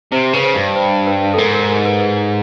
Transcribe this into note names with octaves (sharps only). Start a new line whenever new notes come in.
C3 C5
C#3 B4
C5
G2
C5
B4
A4
G#2 A#4
A#4
A#4
B4
B4